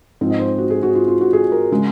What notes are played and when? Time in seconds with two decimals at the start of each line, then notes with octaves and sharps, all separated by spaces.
0.21 G#2 F3 C4
0.30 D#5
0.39 C5
0.58 F#4
0.70 G#4
0.83 F#4
0.95 F4
1.08 F4
1.21 F#4
1.33 G#4
1.52 A#4
1.71 C#3 G#3